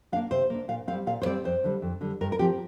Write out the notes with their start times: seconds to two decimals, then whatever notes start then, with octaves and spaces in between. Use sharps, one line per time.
0.12 D4 F5
0.16 A#3
0.31 C3 C5
0.50 A#3 D4
0.68 A#2 F5
0.87 C4 F5
0.92 G3
1.07 A#2 F5
1.22 C5
1.25 G3 C4 D5
1.44 F2 C5
1.64 D3 G3
1.82 F2
2.01 D3 G3
2.21 G2 A#4
2.32 A#4
2.39 F3 C4 G4